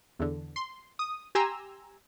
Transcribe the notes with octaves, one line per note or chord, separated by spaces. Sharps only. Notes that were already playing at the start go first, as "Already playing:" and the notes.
E2 D3
C6
D#6
G4 G#5 A#5 C6 E6